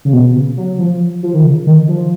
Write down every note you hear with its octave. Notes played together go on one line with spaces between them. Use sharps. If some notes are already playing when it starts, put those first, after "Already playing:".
C#3
B2
B2
C#3
F#3
F3
F3
D#3
C#3
D#3
F3